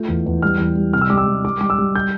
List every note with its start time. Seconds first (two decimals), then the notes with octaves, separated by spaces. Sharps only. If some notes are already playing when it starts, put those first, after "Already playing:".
Already playing: A3 F4 G6
0.08 E2
0.26 E2
0.42 G3 F6
0.59 E2
0.77 G3
0.93 C3 F6
1.01 E6
1.10 G3 D6
1.18 E6
1.27 G3
1.45 G3 D6
1.61 G3 D6
1.70 E6
1.78 G3
1.96 G6